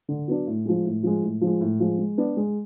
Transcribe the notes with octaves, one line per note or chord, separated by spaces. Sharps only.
D3
F#3 B3 D4
A2
F3 G#3
A2
F3 G#3
A2
F3 G#3
A2
F3 G#3
G#3
B3 D4
G#3